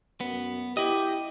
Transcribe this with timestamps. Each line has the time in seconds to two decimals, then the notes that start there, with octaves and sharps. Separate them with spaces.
0.21 F#2 B3
0.77 E4 G4 D#5